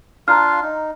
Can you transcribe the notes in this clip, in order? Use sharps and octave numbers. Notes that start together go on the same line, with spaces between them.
D4 F4 F5 A#5 F6
D#4